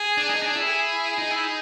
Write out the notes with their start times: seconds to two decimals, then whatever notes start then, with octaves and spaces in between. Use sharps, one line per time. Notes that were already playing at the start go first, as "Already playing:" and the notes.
Already playing: G#4
0.18 D4
0.30 D#4
0.42 D4
0.55 E4
0.68 G#4
1.18 D#4
1.31 E4
1.43 D#4